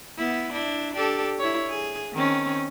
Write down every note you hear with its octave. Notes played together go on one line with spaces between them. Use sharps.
B3 E4
D4 E4
D4 G4 A4
E4 C#5
G#4
D#3 C4 C#4